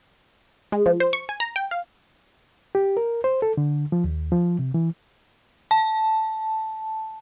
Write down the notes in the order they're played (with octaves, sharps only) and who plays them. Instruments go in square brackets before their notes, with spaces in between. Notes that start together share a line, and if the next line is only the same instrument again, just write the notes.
[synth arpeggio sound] G#3
F3
C5
C#6
G#5
A#5
G5
F5
[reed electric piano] G4
A#4
C5
A4
D3
F3
D#2
F3
C3
E3
[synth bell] A5